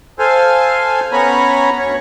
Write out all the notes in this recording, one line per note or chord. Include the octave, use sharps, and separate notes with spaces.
A4 C5 F5 G#5
B3 C#4 C#5 A#5 B5
D2 C#5